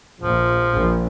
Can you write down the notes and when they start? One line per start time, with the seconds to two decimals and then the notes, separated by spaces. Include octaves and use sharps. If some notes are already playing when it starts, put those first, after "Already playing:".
0.21 A#1 F3
0.74 A#1